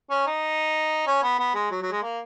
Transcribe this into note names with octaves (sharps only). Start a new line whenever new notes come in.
C#4
D#4
C#4
B3
B3
G#3
F#3
F#3
G#3
A#3